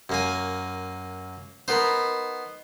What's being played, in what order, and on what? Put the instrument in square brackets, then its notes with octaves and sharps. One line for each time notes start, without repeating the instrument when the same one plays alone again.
[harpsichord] F#2 A#3 G#5
[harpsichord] B3 C5 [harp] D#4 A#4 B5